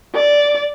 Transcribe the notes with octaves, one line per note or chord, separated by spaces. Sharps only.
D5